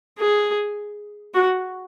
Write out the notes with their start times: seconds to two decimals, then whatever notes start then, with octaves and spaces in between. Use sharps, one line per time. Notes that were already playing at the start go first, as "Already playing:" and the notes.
0.19 G#4
1.34 F#4